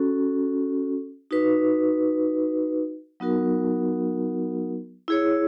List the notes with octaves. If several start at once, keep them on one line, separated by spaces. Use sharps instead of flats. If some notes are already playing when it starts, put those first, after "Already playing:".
Already playing: C#4 F#4 A4
D#4 F#4 B4
F#3 B3 D#4 F#4 A#4
E4 G#4 C#5